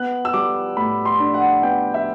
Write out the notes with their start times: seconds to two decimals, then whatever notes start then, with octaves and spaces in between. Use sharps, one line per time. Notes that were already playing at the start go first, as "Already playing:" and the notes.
Already playing: B3 F#6
0.25 E6
0.33 G3 D6
0.77 A2 B5
1.05 C6
1.20 D4
1.34 F#5
1.63 B3 G5
1.94 E5